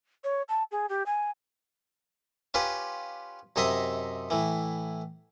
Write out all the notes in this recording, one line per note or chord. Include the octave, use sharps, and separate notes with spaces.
C#5
A5
G#4
G4
G#5
C#4 F4 G4 B4
F#2 C3 D#4 D#5 E5 D#6
A2 E3